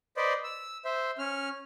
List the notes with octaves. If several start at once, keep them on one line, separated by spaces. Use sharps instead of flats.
B4 C5 D5 D#5
E6
C5 E5
C#4 F6